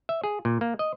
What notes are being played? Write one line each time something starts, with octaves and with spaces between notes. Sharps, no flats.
E5
G#4
A#2
A#3
D#5